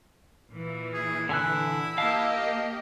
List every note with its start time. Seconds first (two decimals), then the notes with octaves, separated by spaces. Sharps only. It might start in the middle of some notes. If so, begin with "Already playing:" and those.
0.51 A#2 E3
0.94 G#4
1.29 D3 E4 G#5 F#6
1.98 A#3 G4 D#5 F5 A5